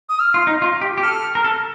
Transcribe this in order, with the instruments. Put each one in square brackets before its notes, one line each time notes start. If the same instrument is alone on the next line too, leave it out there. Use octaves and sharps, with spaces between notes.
[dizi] D#6
F6
[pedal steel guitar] F4
D#4
F4
G4
G4
[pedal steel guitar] A4 [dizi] F6
[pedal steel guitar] A#4
A4